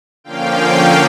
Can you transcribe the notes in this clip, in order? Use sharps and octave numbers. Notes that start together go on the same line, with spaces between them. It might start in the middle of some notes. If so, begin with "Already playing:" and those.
D3 F3 A#3 C#4 F5 G5